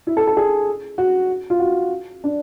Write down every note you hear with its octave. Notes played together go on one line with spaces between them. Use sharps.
E4
A4
A4
G#4
F#4
F4
F#4
D4